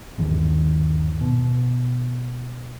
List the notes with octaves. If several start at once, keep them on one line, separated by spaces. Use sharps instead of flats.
G1 D#2 D#3
B2